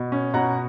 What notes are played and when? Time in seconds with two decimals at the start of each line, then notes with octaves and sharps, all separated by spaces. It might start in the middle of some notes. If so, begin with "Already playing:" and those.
Already playing: B2
0.12 C#4
0.34 B2 F#5 A#5